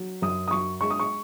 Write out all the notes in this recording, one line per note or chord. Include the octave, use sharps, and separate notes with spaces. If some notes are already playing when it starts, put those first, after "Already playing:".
Already playing: F#3
F#2 D#6
D#6
F#3 C#6
G#3 C#6
D#6
C#6